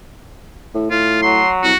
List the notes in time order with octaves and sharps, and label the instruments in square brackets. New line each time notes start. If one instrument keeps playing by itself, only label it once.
[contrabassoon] A2
[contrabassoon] A2 [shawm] F4
[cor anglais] F#3 [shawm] C6
[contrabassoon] C2 [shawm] F#4